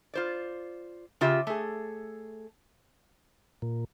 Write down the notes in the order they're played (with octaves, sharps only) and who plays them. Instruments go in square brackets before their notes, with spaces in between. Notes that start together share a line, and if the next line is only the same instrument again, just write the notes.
[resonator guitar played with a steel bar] F4 C5 D5
C#3 F4 G4 E5
A3 G#4
[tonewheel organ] A#2